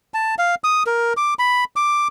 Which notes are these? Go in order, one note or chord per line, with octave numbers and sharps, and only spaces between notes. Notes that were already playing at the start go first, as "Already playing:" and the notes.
A5
F5
D#6
A#4
D6
B5
D6